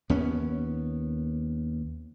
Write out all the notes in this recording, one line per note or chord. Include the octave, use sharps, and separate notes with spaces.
D#2 B3 C#4